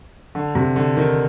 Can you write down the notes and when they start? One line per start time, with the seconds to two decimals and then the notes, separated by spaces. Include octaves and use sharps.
0.35 D3
0.55 C3
0.76 D3
0.97 D#3